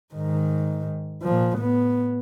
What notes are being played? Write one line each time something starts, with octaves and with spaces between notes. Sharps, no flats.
G#2 D#3
A#2 F3
A2 B3